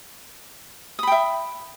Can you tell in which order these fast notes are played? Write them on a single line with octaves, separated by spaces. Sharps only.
D#6 B5 G5 E5